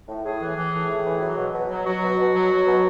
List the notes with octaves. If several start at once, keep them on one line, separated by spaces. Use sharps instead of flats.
A2
A2 G#4
E3
E3
A2
A2
E3
F#3
B2
B2
F#3
F#3 F#4
B2
B2
F#3
F#3
B2